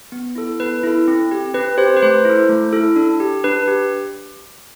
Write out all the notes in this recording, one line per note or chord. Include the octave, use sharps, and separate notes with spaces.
B3
E4 A4
B3 B4
E4 A4
C4
G4
C4 B4
G4 C5
B4
A3 C5
E4 A4
A3
E4 A4
D4
G4
D4 B4
G4